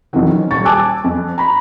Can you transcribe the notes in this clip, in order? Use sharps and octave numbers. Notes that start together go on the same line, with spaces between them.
F2 C3 D#3 E3 F#3
C#4 D#4
D#1 C#6 A6
G#5 A5 D6 E6 F#6
F2
A#5 B5